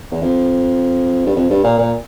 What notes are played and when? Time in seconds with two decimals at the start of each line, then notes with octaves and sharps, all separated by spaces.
0.11 E2
0.22 F2
1.26 G2
1.36 F2
1.50 G2
1.64 A#2
1.78 A#2